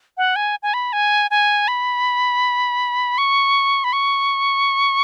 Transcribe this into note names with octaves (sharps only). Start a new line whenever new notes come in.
F#5
G#5
G#5
B5
G#5
G#5
B5
C#6
B5
C#6